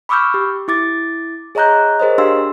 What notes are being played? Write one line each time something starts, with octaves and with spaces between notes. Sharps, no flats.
B5 C#6 D6 E6 F6 G6
G4
E4 D6 A6
G#4 C#5 D#5 A#5 F#6 G6
G#4 A#4 C5 C#5 D#5
D4 G4 F5 C6 E6